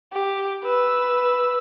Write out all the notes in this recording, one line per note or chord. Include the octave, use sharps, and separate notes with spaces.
G4
B4 E6